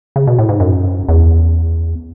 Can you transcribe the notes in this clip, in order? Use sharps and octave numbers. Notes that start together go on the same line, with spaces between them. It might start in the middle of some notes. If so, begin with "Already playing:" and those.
C#3
B2
A2
G#2
F#2
E2